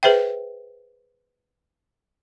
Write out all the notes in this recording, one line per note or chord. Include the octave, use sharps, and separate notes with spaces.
G#4 B4 C5 E5 G5